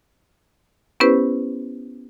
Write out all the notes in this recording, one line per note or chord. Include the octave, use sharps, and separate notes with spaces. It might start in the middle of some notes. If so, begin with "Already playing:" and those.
B3 C#4 E4 G4 B4 C5